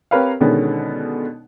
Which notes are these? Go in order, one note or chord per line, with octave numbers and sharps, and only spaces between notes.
C4 G4 A#4 B4 C#5 F5
B2 D3 D#3 G#3 B3 C#4